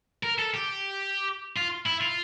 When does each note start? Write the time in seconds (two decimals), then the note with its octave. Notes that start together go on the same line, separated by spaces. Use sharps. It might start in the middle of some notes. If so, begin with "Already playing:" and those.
0.23 A#4
0.39 A4
0.54 G4
1.57 F4
1.86 E4
2.01 F4